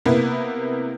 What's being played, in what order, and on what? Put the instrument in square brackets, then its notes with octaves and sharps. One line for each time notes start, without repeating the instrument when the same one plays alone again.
[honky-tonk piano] C3 A#3 B3 E4